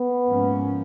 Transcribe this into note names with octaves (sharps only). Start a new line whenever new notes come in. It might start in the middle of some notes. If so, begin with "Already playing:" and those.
Already playing: B3
G#2 F3 A#3 C#4